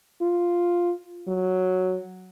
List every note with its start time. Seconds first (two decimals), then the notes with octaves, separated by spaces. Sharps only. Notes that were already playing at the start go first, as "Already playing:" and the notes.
0.22 F4
1.28 F#3